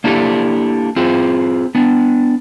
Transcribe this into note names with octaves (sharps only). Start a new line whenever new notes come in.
A#3 D4 E4 G4 A4
C4 F4 G#4
B3 D4